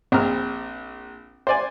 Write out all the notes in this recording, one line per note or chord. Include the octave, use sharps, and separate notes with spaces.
A#1 C4 A#5 F6
C5 D5 G#5